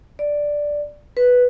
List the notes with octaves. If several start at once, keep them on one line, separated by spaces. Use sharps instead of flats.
D5
B4